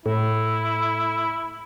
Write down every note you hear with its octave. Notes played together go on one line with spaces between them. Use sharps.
A2 E4